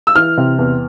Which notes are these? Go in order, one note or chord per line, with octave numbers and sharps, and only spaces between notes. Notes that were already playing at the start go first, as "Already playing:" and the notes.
E6
E3 F6
C3
E2